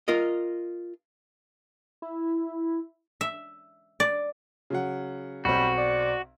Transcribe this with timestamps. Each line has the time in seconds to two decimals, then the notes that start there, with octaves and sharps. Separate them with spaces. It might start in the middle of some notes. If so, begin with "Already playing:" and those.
0.08 F4 A#4 D#5
2.02 E4
3.21 E5
4.00 D5
4.70 C#3 F#3 F#5
5.45 B1 G3 C4 F#4
5.78 D5